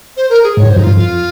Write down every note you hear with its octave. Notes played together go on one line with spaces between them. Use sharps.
C5
A#4
G#4
G#2 C#5
G2
C5
F2 D#4
G2 F4
F2 F4